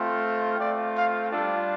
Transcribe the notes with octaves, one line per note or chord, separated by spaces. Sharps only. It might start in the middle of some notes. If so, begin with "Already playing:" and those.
Already playing: A3 C4 F4
A3 C4 F4 D5
F5
G3 D4 F4 A4